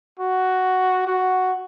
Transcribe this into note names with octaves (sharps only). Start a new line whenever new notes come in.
F#4
F#4